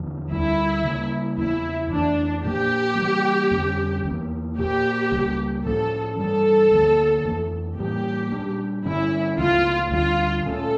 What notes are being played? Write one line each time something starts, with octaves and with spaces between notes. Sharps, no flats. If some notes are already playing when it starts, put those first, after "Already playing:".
Already playing: E2 D3 F3
D2 D3 G3 E4
C#3 G3 A#3
E2 C#3 F3 E4
F2 E3 A3 D4
A#2 F3 A#3 G4
C#3 E3 G3 A#3
F2 D3 G3 C#4
E2 E3 A#3
A#2 F3 A#3 G4
C#2 C#3 G3 A#3
A2 F3 C#4 A4
G2 E3 G3 A4
D2 D3 F3 A#3
F2 E3 A3
A2 E3 G3 A#3 G4
A#2 G3 D4
G2 D3 G3 C#4 E4
C#2 C#3 F3 A3 F4
D2 D3 G3 F4
A#2 A3 C#4 A4